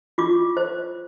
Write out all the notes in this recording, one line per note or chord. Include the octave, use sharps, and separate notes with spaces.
F4 D6
C5